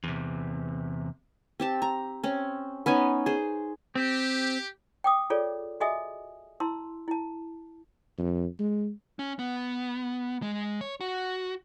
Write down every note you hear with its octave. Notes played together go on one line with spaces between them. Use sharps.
E2 C3
C4 G4 A5
A#5
C4 C#4
B3 C#4 D#4 G#5
G#4 C5
C4 G4
G5 D6 D#6
F4 G#4 A4 C#5 D5
F#4 G#4 D#5 E5 G#5 D#6
E4 A5 C6 E6
E4 A5
F2
G#3
C#4
B3
G#3
C#5
F#4